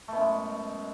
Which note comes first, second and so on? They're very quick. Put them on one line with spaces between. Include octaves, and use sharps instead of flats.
A3 B2 F#2 G#3